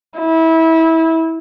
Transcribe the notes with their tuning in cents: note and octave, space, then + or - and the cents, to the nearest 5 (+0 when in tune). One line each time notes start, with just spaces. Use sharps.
E4 -25